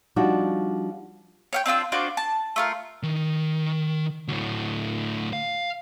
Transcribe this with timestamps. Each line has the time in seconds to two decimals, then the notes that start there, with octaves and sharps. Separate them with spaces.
0.16 F3 G3 D4 D#4 F#4
1.53 C#5 F5 G5
1.66 C4 D4 F4 E6
1.92 D4 F4 F#4 C5
2.17 A5
2.56 A3 F4 A#4
3.03 D#3
4.28 D2 A2
5.33 F5